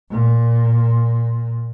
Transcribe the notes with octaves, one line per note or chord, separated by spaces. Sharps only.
A#2